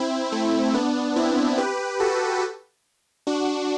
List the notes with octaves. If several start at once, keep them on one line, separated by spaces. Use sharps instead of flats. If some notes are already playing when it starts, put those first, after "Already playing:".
Already playing: C4 E4
A3 C4
B3 D4
C4 E4
G4 B4
F#4 A4
D4 F#4